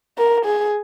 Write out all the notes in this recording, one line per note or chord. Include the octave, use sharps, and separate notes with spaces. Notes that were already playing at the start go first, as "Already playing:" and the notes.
A#4
G#4